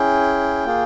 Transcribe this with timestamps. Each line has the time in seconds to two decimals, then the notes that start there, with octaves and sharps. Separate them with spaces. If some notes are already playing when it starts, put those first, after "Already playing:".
Already playing: C#4 E4 G#4 G5
0.65 A#3 F4 G#4